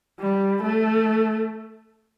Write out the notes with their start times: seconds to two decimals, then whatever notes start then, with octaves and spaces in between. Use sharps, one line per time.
0.20 G3
0.64 A3